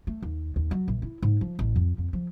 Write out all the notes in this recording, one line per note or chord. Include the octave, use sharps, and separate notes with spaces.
A3
D#2
D#2
F#3
A#1
E4
G#2
F3
A1
F2
F2
F3